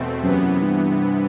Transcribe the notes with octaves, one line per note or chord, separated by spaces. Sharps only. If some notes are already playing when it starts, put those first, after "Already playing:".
Already playing: E2 B2 A3 C4
F#2 C3 E3 B3
G2